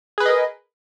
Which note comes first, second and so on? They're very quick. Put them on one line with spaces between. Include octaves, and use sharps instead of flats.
G#4 B4 B5 D#5 A#4